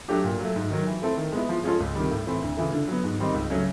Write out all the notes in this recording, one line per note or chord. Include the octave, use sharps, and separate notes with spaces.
F#3 A3 D4 G4
A#2
F#3
A3
G#2
D#3 F#3
E3
A3 C4 E4 A4
D#3
G#3 B3 E4
F3
G#3 C#4 F4 A4
C#2
C3 D#3 G3
A2
E3 A3 C4 E4
D2
C#3 E3 A3
D3
F#3 B3
G#2
D#3 G3 C4 D#4
C#2
C#3 F#3 A3 C#4